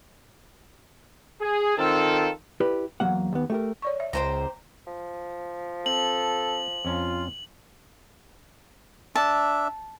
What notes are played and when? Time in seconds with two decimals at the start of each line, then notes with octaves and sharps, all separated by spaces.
1.42 G#4
1.77 D#3 C4 F4 A4
2.60 E4 G4 B4 D5
3.00 E2 F#3 A#3 F#5
3.33 D#2 B3
3.50 A3 G4 A#4
3.82 C#5 D5 C#6
4.00 E5
4.13 C#2 G4 C5 A#5
4.87 F3
5.86 C4 A4 F#7
6.85 F2 C#4 F4 A#5
9.15 D4 E5 A5